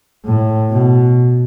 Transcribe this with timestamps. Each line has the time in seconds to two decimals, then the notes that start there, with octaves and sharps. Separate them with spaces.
0.25 A2
0.71 B2